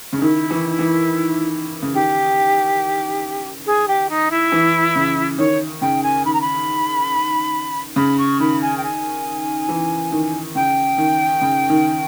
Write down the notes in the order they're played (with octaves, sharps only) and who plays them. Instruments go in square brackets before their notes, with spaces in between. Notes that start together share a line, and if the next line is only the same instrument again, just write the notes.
[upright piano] C#3 [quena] D#4
[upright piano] D#3 [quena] E4
[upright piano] E3
E3
C#3
[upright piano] D#3 [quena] G4
[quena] G#4
G4
D#4
E4
[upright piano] E3
C#3
[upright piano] D#3 [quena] C#5
[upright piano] C#3 [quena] G5
[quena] G#5
[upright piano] D#3 [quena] B5
[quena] A#5
B5
[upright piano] C#3 [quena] B5
[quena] C#6
[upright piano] D#3 [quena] B5
[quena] G#5
G5
G#5
[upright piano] E3
D#3
[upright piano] C#3 [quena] G5
[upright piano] D#3
C#3
D#3